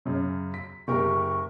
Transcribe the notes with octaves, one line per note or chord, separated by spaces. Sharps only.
F#2 C#3
B6
F#1 G4 A#4 C#6